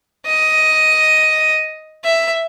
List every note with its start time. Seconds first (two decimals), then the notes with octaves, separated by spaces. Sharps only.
0.26 D#5
2.04 E5